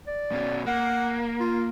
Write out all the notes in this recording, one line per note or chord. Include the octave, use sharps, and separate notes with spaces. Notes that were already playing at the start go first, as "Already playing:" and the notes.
D5
B2 C#4
A#3 F#5
F4